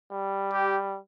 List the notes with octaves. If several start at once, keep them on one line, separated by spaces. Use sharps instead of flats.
G3
G4